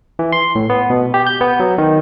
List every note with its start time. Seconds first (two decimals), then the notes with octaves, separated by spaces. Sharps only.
0.19 E3
0.32 C6
0.55 A2
0.70 B3
0.90 B2
1.14 G4
1.27 G6
1.41 B3
1.60 F#3
1.78 D#3